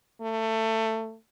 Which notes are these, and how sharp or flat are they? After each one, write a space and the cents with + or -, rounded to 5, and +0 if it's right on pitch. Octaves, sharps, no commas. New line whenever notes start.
A3 +20